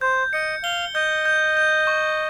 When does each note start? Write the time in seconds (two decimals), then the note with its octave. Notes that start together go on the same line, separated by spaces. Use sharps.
0.01 C5 G6
0.33 D#5 C#7
0.63 F5 G7
0.95 D#5 G6
1.25 G6
1.57 G6
1.87 C#6